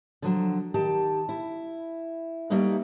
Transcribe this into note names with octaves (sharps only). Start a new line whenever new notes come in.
D3 F3 F#3
D#3 G4 A5
E4
G3 A3 A#3 D#4 B4